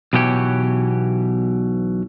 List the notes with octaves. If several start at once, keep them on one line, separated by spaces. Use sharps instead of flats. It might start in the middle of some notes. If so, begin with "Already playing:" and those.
B1 B2 E3 G4 C#5